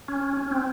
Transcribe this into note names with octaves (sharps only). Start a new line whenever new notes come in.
C#4
C#4
C4